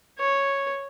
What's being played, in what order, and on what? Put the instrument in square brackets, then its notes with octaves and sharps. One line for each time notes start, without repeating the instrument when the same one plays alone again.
[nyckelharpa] C#5